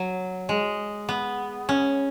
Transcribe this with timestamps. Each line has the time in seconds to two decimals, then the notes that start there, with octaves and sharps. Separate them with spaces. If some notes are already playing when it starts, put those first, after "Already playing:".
Already playing: F#3
0.49 G#3
1.09 B3
1.69 C#4